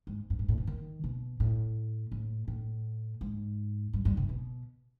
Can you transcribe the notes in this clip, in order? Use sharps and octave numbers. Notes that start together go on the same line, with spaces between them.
G#2
G2
G#2
A2
B2
D#3
B2
A2
A2
A2
G#2
G2
G2
C3
B2